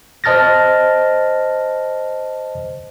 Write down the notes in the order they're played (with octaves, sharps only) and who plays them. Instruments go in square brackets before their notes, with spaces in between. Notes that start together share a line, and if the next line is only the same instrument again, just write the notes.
[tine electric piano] C5 D#5 A5 F6 A6 A#6